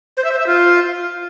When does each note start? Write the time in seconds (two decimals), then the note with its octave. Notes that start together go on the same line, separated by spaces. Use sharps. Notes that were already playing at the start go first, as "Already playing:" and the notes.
0.17 C5
0.24 E5
0.32 C5
0.39 E5
0.47 F4